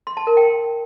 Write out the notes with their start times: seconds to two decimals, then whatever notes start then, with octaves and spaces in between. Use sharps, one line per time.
0.07 C6
0.17 A5
0.27 A#4
0.37 G5